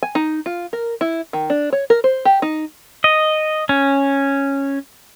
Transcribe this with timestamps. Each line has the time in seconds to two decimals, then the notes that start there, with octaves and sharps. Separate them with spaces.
0.03 G#5
0.15 D#4
0.46 F4
0.73 A#4
1.01 E4
1.33 D#3
1.50 D4
1.73 C#5
1.90 A#4
2.04 C5
2.25 G4
2.42 D#4
3.04 D#5
3.69 C#4